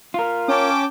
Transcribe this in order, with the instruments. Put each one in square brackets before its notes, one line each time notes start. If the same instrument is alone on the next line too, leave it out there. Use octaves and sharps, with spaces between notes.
[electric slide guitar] F4 A#4
[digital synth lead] C#4 [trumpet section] G5 A5 D6